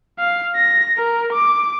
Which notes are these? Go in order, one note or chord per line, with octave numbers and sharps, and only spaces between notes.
F5
A#6
A#4
D6